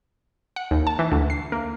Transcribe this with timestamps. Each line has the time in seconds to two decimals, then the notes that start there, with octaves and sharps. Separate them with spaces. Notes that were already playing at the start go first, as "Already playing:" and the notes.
0.56 F#5
0.71 D#2
0.87 A5
0.99 E3
1.12 D2
1.30 C7
1.52 A#3